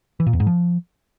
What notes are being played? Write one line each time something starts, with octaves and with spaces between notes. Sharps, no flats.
E3
A#2
E2
G#2
F3